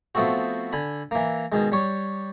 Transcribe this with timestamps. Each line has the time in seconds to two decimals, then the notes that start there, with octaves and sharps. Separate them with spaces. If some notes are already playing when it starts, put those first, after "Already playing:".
0.15 F3 A3 B3 C4 F#4
0.73 D3 G#5 B5
1.11 E3 A#3
1.52 B2 D#3 G#3
1.72 G3 C#5